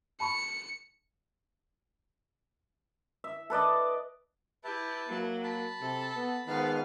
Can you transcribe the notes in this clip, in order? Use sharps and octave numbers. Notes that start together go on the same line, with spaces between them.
A5 B5 C#6 C#7
E5
A4 B4 D5 D#5
E4 G4 B4 E5 A5
F#3 A#3
A5 B5
C3 A4
B3
G#2 D#3 F3 B3 F5